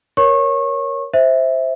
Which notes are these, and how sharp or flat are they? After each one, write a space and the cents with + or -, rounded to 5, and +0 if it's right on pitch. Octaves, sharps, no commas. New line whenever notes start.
A#4 +20 C#5 +0 C#6 -25
C5 +0 E5 -10